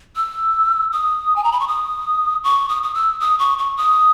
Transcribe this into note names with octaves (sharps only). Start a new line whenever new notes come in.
E6
D#6
G#5
A#5
B5
C#6
D#6
C#6
D#6
D#6
E6
D#6
C#6
C#6
D#6